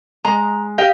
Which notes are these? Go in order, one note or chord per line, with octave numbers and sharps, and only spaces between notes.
G#3 A#5
G4 D#5 F5 G5